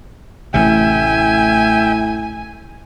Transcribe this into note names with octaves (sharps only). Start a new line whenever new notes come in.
A1 A2 C3 E5 G5 G#5